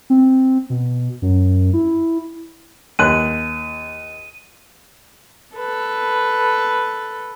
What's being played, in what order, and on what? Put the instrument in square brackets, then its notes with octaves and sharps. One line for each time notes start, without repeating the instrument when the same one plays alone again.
[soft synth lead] C4
B2
F#2
E4
[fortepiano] D#2 F#6 [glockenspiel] D#7
[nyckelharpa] A4 B4